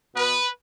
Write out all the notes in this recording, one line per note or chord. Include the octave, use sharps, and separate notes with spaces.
B2 B3 B4